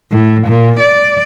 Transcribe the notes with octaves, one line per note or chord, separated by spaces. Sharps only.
A2
A#2
D5